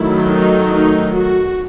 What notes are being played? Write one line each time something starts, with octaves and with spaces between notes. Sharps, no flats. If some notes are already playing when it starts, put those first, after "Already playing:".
Already playing: D#3 F#3 A3 E4
D#4
D#4
F#4